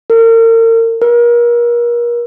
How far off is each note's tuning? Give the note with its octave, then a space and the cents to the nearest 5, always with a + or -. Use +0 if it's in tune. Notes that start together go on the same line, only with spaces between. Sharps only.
A#4 -40
A#4 +35